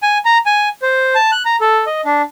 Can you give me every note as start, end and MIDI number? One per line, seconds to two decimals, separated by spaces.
0.03 0.18 80
0.25 0.38 82
0.46 0.69 80
0.82 1.15 72
1.15 1.31 81
1.32 1.43 90
1.45 1.56 82
1.61 1.85 69
1.87 2.01 75
2.05 2.22 62